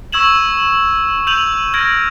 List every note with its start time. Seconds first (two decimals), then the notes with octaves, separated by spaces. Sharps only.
0.12 C#6 E6 G#6 E7 F#7
1.27 E6 G6 D#7 F7 F#7
1.74 F6 G#6 A#6 D7